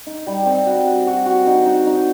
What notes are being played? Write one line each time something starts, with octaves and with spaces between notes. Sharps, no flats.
D#4
G3
C4
F#4
F#4
F#4
F#4
D#4
D#4
D#4